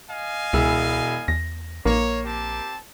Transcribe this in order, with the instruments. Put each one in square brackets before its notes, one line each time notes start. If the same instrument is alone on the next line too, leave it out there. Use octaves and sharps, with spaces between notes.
[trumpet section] D#5 F5 G#5
[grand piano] E1 E4 G#4 [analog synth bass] C#2
[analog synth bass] E2 [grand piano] A#6
[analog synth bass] A#1 [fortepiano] A#3 [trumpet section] C#5
[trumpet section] C4 G4 A5